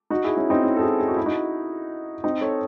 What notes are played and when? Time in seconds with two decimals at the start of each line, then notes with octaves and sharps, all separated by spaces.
0.10 D#4 F#4
0.24 E4 G#4
0.37 C#4 E4
0.50 C4 D#4
0.64 C#4 E4
0.76 A4
0.81 E4 G#4
1.00 G#4
1.08 F#4
1.17 E4
1.26 D#4 F#4
2.24 C4 D#4
2.41 A4 C#5